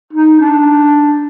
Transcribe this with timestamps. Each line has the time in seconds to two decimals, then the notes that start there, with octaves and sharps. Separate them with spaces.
0.13 D#4
0.40 D4